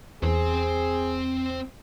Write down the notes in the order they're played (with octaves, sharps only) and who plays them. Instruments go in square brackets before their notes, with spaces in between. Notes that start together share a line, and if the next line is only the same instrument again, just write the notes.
[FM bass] E2 [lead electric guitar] C4 C5 [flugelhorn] G#4